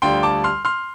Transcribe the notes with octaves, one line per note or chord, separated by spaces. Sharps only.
D2 D3 G3 F4 G5 C6
A5 D6
C6 F6
C6 F6